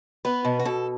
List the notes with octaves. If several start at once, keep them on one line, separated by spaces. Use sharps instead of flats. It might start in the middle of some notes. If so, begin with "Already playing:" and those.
B3 B4
B2
F#4
B2 A4